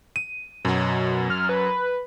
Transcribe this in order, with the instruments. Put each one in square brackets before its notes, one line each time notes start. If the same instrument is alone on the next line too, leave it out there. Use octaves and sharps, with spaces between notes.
[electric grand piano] D#7
[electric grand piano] F#2 F#3 [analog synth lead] B2
[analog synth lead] F6
B4